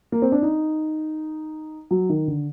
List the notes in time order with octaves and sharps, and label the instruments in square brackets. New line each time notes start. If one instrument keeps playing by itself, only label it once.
[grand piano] A#3
C4
D4
D#4
F#3
D#3
D3